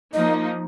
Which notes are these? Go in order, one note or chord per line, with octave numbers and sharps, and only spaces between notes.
F3 A#3 D#4 D#5